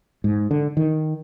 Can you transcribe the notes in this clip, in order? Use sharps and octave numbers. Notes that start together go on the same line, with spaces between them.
G#2
D3
D#3